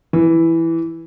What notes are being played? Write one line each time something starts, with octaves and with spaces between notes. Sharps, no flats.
E3